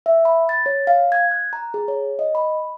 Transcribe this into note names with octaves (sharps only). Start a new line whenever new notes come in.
E5
B5
A6
C#5
F5
G#6
F#6
A#5
G#4
C#5
D#5
B5